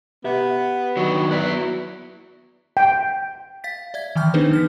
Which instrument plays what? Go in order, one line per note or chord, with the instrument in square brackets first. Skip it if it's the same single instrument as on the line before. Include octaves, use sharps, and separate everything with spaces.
[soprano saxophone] B3 [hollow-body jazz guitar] G4 E5
[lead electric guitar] D#3 D4 [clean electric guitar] F#3
[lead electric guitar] B3 E4 [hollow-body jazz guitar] B4 D5
[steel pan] G5
[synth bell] F5 A6 B6
D5 E5 G#6
D#3 E3 G5 F6 G6
B3 D4 D#4 G#4 B4 C5
E3 F6 B6